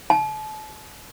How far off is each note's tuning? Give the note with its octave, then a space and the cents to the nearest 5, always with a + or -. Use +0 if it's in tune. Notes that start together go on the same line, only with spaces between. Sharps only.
A5 -35